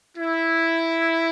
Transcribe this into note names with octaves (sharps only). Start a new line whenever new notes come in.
E4